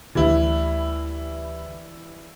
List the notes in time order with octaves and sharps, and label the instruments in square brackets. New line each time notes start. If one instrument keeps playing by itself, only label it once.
[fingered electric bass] D2 D3 [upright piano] E3 G3 E4